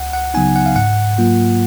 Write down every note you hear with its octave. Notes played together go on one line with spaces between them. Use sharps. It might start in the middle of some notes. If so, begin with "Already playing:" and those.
Already playing: C#2 F#5
F#5
C#3 F#3 B3 D#4 G#5
F#5
F5
G#2 F#5
F#3 A#3 F4